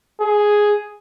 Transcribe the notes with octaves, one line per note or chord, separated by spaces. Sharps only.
G#4